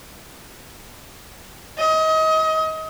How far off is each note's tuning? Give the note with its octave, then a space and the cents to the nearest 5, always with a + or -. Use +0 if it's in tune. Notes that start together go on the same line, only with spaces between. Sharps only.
D#5 +30